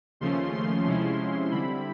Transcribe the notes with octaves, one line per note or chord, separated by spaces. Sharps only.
D#2 C#3 F3 A3 C#4 C6
C6
C3 F3 G#3 C#4 E4
D3 G3 C4 E4 B5